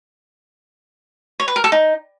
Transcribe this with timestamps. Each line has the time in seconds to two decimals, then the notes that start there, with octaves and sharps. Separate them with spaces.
1.40 C#5
1.48 B4
1.56 A#4
1.64 A4
1.72 D#4